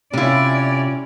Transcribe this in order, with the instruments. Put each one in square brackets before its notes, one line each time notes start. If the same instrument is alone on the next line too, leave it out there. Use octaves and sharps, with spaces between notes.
[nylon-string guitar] C3 F4 [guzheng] G3 E4 [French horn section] C#4 [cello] D5